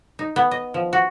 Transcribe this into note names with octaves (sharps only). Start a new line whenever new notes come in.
D#4
B3
D#5
F3
F#4